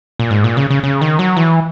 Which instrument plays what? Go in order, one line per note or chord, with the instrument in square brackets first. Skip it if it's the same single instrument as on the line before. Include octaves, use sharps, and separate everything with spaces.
[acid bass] A#2
G#2
A#2
C#3
C#3
C#3
D#3
F#3
E3